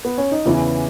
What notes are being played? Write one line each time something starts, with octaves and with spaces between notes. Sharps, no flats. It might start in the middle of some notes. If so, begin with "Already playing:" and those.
B3
C#4
D#4
E2 C#3 E3 E4